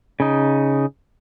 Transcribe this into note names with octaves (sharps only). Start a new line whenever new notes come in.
C#3 D#4